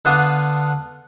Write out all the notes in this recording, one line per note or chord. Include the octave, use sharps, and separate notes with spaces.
D3 B3 D4 F4 C6 D#6